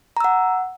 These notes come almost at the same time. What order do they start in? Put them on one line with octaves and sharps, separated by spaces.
A#5 E6 F#5